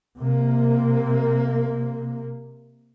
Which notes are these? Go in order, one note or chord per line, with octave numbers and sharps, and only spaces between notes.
C3 A#3